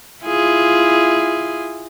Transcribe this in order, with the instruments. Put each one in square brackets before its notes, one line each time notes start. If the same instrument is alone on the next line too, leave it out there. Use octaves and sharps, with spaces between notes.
[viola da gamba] E4 F4 G#4